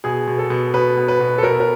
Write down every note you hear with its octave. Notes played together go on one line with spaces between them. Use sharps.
B2 G#4
B2
A4
B2
B2 B4
B2
B4
B2
A4
B2 A#4
A#4